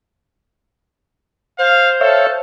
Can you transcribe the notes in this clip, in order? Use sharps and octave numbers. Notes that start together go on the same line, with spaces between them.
C5 F5
A4 C#5 E5 F5